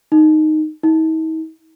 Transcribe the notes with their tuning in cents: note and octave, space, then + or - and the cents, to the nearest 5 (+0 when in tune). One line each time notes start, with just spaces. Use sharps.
D#4 -5
D#4 +45